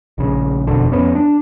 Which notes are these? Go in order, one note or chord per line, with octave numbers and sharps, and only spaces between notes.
A#1 C#3
E1 F2 B2 D3
F2 B3 C#4
D4